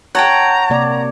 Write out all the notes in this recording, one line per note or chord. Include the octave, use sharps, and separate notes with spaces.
C#5 F#5 G5 A5 A#5
C3 A#3 D5